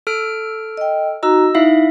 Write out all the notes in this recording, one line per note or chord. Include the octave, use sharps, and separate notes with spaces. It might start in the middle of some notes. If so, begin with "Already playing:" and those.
A4 F6 D7
D#5 G5
D#4 F#4 D#5 A#5 E6
D#4 E4 E5 F5